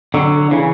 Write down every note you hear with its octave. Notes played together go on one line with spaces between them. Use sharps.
D3 F#3
C#3 E3